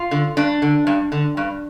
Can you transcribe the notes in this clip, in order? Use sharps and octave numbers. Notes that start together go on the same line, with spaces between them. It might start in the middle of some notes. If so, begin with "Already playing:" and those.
Already playing: F4
D3
G2 D4
D3
G2
D3
G2